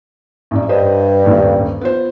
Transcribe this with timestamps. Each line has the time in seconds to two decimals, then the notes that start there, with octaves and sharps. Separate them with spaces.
0.51 A1 F#2 D5
0.69 G2 B4 C5 D#5
1.24 D#1 A1 D2
1.81 B3 F4 C5